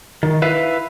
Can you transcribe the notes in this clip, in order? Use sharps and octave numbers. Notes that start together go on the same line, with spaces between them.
D#3
E4 B4 E5 F5